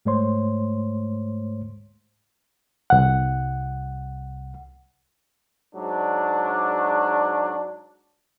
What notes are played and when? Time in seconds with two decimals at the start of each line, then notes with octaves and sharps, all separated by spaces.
0.05 G#2 G#3 A3 C5 C#5 C6
2.90 C2 F#5
5.75 G#2 F#3 D4